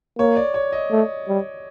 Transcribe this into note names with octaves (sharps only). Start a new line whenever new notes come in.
A#3 C#5
D5
C#5
D#5
A3
G3